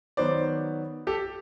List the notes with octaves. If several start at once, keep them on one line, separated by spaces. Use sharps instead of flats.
D#3 F#3 B3 C5 D5
G4 A4